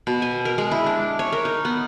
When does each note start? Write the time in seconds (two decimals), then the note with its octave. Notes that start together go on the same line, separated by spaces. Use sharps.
0.07 B2
0.22 G#5
0.45 A#4
0.58 G#3
0.71 E4
0.86 D4
1.19 C#5
1.32 A#4
1.45 D#4
1.65 B3